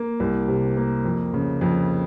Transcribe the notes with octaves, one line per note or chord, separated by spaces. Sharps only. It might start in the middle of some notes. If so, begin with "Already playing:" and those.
Already playing: A#3
C2
C3
A#3
F2
C#3
F2